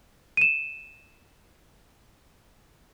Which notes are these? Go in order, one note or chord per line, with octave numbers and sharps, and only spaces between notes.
D#7 E7